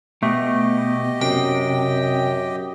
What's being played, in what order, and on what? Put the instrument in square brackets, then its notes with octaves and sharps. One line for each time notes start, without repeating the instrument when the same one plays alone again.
[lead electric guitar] B2 [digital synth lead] A3 [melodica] G4 D#5
[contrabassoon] F#2 [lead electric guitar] C3 [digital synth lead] G5